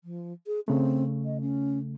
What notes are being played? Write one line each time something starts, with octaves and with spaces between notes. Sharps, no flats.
F3
G#4
C#3 A3 C4
D#5
C#4